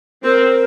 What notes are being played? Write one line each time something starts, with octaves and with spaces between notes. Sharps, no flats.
C4 A#4